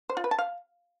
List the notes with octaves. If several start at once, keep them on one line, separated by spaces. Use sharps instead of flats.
C5
F4
B4
A5
F5